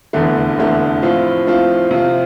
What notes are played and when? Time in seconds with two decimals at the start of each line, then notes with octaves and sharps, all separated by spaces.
0.13 F1 E2 D3 A3
0.57 F1 E2 D3 A3
1.02 A2 F3 C4 F4
1.47 A2 F3 C4 F4
1.91 C3 F3 C4 F4